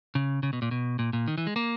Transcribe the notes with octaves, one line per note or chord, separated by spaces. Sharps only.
C#3
C#3
B2
A#2
B2
A#2
A#2
D#3
E3
G#3
A#3